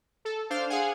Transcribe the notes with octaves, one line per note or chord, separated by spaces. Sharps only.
A4
D4 C5 F5
G#4 F5 F#5 G#5